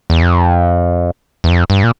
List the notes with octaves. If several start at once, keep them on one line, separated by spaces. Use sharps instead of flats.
E2
F2
E2
F2
G2
A#2